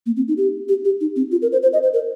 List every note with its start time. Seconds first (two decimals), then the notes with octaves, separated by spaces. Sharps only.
0.06 A#3
0.17 C4
0.28 D#4
0.37 G4
0.69 G4
0.85 G4
1.01 D#4
1.16 C4
1.32 F4
1.42 A#4
1.52 C5
1.63 C5
1.73 D#5
1.83 C5
1.94 A#4